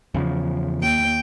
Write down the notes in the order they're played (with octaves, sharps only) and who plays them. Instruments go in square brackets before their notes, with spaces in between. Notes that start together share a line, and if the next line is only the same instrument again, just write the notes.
[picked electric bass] E2 C#3 F3
[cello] D#2 G5